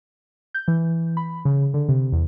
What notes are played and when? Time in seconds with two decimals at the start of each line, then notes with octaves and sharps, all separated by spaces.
0.54 G6
0.68 E3
1.17 B5
1.45 C#3
1.74 D3
1.89 C3
2.12 E2